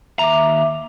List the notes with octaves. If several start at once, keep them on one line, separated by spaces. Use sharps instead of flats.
D#2 E5 A#5 D6